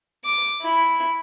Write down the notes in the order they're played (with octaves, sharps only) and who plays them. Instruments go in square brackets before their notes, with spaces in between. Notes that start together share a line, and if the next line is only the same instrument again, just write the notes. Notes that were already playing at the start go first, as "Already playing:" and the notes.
[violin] D6
E4